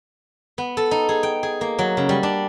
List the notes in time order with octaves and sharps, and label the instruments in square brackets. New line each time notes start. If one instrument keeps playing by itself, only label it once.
[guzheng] B3
A4
D#4
G#4
G5
G#4
A#3
F#3
C#3
G3
D4